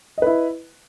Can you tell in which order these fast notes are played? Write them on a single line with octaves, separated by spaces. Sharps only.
D#5 B4 E4